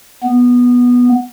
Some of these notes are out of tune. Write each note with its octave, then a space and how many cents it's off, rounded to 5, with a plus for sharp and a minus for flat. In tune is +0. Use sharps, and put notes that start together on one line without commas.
B3 -10